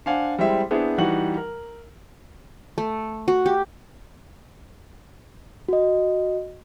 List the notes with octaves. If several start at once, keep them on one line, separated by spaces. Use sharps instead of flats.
D4 C5 F5 F#5 G#5
G3 G#3 C4 E4 G4 E5
B3 C4 D4 E4 G#4 C5
E3 G3 D#4 F#4 F#5 F#7
A#4
A3
F#4
G4
F#4 D#5